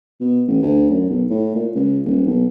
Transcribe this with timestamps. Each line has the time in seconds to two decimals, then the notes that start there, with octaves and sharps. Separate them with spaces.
0.21 B2
0.48 A1
0.63 D2
0.90 F#2
1.09 B1
1.30 A2
1.55 A#2
1.75 C#2
2.05 D#1
2.26 B1